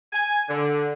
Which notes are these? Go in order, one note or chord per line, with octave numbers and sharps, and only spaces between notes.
G#5
D3